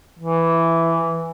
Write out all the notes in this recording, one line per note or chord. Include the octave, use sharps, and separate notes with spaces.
E3